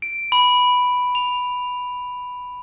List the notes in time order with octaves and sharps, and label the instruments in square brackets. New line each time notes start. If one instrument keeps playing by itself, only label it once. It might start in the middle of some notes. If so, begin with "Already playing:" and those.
[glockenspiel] D7
B5
F7